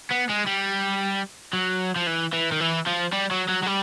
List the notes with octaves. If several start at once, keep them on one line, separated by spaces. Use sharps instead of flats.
B3
G#3
G3
F#3
F3
E3
E3
D#3
E3
F3
G3
F#3
F#3
F#3
G3